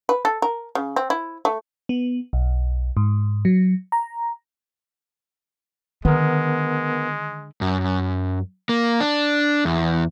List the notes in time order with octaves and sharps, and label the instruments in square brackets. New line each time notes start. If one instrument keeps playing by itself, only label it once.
[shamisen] B4
A4
A#4
C#3
C4
E4
A3
[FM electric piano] B3
B1
G#2
F#3
A#5
[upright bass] D3 [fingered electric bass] D#3 [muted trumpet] G#3 [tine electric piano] B3 A#4
[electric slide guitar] F#2
A#3
D4
E2